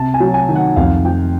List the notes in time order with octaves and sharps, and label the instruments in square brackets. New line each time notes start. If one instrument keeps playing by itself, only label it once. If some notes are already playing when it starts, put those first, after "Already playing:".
Already playing: [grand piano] C3 A5
G#5
F#3
G#5
D#3
F#5
F2 F5
F3 G5